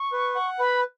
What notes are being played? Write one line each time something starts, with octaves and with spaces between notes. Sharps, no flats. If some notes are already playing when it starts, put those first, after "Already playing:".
Already playing: C#6
B4
F#5
B4 B5